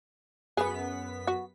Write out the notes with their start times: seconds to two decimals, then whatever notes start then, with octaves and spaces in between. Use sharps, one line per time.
0.57 F#2 B3 G#4 B4 B6
1.27 F#4